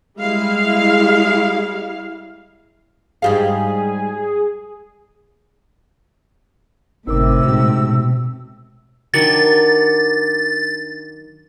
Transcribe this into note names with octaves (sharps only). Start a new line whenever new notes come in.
G3 G#3 E4 F5
G#2 G3 G#4 F5
G1 A2 C3 D#4 A#4 D6 E6
A#2 G#3 D#4 F#4
B2
D#3 F#3 D4 A6